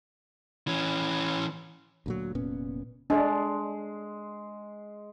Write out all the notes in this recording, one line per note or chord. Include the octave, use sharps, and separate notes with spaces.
E3 C#4
D2 A#2 F#3
F1 A#2 B3 C#4
G#3 D4 D5